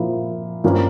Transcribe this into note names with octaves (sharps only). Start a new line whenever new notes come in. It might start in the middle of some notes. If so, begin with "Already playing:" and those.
Already playing: A#2 F3 A#3 E4
G2 F3 A#3 C#4